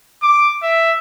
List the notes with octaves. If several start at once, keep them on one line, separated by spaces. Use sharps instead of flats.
D6
E5